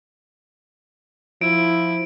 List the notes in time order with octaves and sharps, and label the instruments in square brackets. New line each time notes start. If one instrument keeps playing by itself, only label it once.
[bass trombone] F3 [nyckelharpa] E4 [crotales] D7